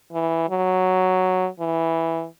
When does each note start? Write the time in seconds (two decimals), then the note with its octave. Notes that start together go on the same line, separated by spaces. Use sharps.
0.12 E3
0.49 F#3
1.60 E3